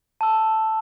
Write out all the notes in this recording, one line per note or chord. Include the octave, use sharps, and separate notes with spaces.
A5 E6